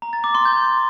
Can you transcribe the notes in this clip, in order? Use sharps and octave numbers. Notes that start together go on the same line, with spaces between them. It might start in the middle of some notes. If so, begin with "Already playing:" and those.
A#5
A6
D6
C6
G6